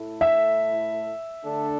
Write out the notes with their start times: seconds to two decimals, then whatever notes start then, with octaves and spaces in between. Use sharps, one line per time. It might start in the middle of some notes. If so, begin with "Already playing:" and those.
Already playing: A2 A3 E4 A4
0.21 E5
1.44 D3 A3 D4 A4